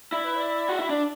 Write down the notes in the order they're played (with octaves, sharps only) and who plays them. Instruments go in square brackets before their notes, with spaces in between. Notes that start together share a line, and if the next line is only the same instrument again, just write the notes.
[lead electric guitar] E4 [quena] D5
[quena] B4
D5
[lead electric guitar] F#4
[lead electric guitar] E4 [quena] E5
[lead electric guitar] D4 [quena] D5